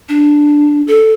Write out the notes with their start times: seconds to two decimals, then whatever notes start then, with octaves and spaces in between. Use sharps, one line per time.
0.09 D4
0.88 A4